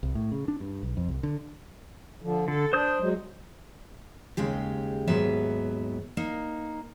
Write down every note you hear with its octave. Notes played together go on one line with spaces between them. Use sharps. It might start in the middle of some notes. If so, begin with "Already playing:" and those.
C2
A2
C#3
D4
G2
B1
F2
C2
D3
D3 F3
D3 A4
D4 C5 D#6 G6
F#3 G#3
D#2 C#3 G#3 G4
D#2 G#2 F#3 B3 E5
A#3 D#4